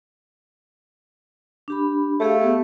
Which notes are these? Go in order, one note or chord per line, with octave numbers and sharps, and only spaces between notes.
D4 G4 B5
A3 G4 G#4 F5
B3 G4